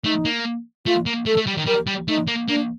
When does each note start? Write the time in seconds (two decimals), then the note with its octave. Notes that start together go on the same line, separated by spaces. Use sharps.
0.04 A3 D#4
0.25 A#3
0.86 A3 F4
1.06 A#3
1.26 A3 A4
1.37 A3
1.47 G3
1.57 D#3
1.66 G3 A#4
1.87 G3
2.08 A3 D#4
2.27 A#3
2.48 A#3 D4